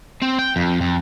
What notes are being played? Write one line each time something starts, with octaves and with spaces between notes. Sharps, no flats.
C4
G5
F2
F2